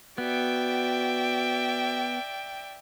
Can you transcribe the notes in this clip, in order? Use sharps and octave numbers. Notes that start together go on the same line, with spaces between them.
B3 F#4 D5 E5 G5